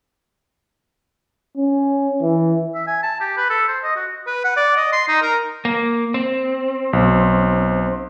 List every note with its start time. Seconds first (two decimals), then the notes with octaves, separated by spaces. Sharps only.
1.57 C#4
2.22 E3
2.74 E5
2.88 G#5
3.03 A5
3.20 G4
3.37 B4
3.50 A4
3.68 C5
3.83 D#5
3.96 F#4
4.27 B4
4.44 F#5
4.57 D5
4.76 D#5
4.92 C6
5.08 D#4
5.22 A#4
5.65 A#3
6.14 C4
6.93 B1